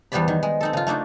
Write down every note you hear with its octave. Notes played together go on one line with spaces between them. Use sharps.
E2 G3 B3 C5 D5 B5
D#3
G#3
C4 D#4 A4
C#3 F4
A3 A#3 D4 D#4